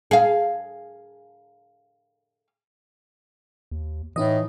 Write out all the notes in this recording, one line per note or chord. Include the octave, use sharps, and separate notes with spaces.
G#4 F5
D#2
A2 E3 D#4 E4 D#5